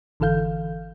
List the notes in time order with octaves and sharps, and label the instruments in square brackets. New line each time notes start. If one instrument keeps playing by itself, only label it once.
[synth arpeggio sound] G#1 D3 E3 A4 F5 G6